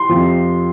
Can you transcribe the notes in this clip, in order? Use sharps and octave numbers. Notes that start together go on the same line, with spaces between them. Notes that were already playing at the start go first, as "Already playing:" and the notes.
Already playing: C6
F2 C3 F3